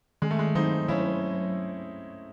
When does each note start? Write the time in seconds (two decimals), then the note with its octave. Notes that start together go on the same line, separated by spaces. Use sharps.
0.22 D#3 G#3
0.31 A3
0.39 G#3
0.55 F#3 C4 D#4
0.88 F#3 C#4 E4